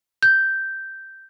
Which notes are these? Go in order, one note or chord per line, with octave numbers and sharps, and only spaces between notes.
G6